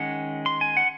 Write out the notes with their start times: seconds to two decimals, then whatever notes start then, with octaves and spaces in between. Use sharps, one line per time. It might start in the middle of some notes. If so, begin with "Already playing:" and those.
Already playing: D#3 G#3 C#4 F#5
0.46 C6
0.61 G#5
0.77 F#5